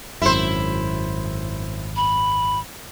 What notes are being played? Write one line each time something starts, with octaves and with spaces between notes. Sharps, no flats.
G#1 F#2 E4 C5
B5